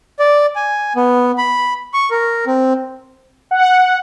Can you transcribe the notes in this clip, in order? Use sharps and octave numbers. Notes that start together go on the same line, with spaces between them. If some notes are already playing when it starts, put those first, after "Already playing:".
D5
G#5
B3
B5
C#6
A#4
C4
F#5